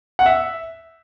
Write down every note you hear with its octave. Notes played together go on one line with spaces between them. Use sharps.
F#5
E5